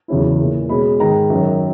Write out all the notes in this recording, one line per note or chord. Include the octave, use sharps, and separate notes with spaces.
E2 C#3 F#3 C#4 E4
A#2 A#3 C#4 E4
B2 G#3 C#4 B5
G#2 D#3 G#3 D#4 A#5
F#2 D#3 F#3